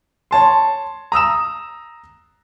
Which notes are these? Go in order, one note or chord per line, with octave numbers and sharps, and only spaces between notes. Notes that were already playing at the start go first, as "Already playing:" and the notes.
C#5 A5 C6
A#5 D#6 E6 E7